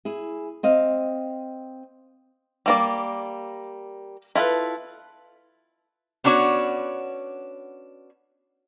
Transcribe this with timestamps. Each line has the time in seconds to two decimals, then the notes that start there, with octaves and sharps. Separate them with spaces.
0.05 E4 G#4
0.63 C4 D#5 F5
2.66 G3 A#3 D5
4.35 E4 F4 A4 B4
6.24 B3 C#4 D4 F#4 C#5